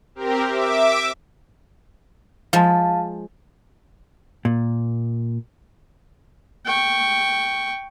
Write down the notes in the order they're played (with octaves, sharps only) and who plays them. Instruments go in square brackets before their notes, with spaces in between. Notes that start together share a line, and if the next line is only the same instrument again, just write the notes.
[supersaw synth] C4 G4 A#4
E5 D6
[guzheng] F3 G#3 [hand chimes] F5 A5
[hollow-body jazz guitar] A#2
[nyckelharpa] G5 C#6